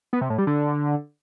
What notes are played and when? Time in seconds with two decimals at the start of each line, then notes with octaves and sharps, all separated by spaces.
0.13 B3
0.21 C3
0.30 A2
0.38 G3
0.47 D3